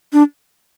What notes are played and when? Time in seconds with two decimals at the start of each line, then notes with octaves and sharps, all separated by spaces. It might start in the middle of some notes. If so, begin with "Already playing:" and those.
0.13 D4